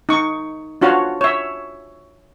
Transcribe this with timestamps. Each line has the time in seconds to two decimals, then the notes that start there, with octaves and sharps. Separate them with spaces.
0.09 D#4 C#6
0.81 D4 F4 F#4 C#5 F5 F#5
1.21 C#5 E5